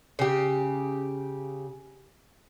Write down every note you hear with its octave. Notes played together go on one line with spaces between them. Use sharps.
C#3 G4